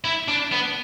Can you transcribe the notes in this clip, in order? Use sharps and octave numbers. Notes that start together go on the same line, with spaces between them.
E4
D4
B3